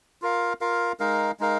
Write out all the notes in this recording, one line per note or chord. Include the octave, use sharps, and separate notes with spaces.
F4 A#4 F5
F4 A#4 F5
G#3 D#4 A#4 F5
G#3 D#4 A#4 F5